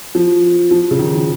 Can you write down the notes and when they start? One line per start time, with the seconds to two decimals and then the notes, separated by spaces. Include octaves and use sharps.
0.15 F3
0.71 F3
0.91 C#3
0.99 D#3
1.14 F3